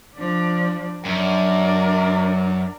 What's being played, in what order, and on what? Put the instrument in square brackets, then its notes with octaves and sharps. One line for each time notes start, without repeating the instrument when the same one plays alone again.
[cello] F3 D4
[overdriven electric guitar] F#2 [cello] D4 A#4